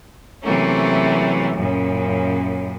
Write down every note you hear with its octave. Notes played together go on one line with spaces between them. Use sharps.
C3 E3 F#3 A3 A#3 C#4
F#2 A#2 C#3